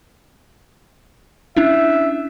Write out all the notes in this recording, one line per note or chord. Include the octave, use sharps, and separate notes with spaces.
C#4 D4 E4 E5